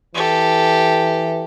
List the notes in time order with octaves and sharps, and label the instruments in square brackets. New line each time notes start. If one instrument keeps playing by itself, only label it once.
[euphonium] E3 [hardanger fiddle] G4 A4